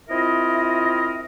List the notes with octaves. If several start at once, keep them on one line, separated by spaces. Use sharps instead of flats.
C4 E4 F4 A#4 D#5 E5